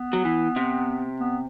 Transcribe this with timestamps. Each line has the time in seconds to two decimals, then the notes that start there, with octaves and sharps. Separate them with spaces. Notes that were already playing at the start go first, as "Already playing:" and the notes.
Already playing: B3
0.13 F#3
0.25 E3
0.56 C3
1.20 B3